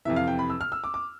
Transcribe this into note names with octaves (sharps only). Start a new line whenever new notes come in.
F2 C3 E3 E5
F5
G5
B5
E6
F6
E6
D6
D6